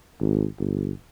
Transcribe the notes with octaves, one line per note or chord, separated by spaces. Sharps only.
G#1
G1